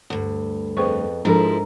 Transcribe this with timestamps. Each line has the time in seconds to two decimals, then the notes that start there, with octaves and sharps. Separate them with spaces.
0.10 D2 G2
0.77 F2 B3 G#4 C5 C#6
1.25 G#2 F3 G#3 D4 E4 A4 A#4